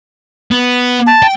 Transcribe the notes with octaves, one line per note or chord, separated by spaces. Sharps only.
B3
A5
G5